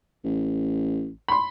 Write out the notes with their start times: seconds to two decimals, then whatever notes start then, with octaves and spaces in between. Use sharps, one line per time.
0.24 A1
1.28 B5 C6